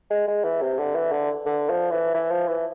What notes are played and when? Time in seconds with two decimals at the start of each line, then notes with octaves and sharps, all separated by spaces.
0.11 G#3
0.28 G#3
0.44 E3
0.62 C3
0.78 D3
0.96 E3
1.12 D3
1.46 D3
1.70 F3
1.91 E3
2.14 E3
2.31 F3
2.48 E3